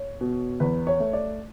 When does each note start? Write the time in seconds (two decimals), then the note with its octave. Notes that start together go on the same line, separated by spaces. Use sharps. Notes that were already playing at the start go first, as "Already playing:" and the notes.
Already playing: C#5
0.21 B2
0.60 E2 B4
0.87 C#5
1.00 A3
1.13 D5